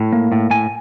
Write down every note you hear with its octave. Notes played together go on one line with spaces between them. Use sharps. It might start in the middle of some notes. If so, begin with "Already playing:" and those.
Already playing: A2
A#3
A2
A2 G#5